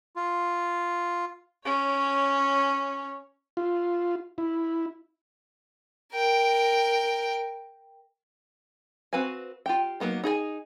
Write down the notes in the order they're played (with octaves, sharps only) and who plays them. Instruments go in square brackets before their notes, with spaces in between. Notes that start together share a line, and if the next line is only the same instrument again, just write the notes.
[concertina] F4
[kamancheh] C#4 C#5
[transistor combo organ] F4
E4
[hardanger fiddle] A#4 G5
[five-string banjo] C4 F#4 B4 F5 G#5
F4 G4 G5
F#3 A#3 B3 D#4
D#4 G#4 A#4 G#5